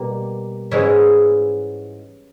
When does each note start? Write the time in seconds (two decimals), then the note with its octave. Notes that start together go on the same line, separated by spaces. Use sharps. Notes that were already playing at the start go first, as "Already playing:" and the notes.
Already playing: B2 G3 A#3
0.71 G#2 E3 G#3 C#4 E4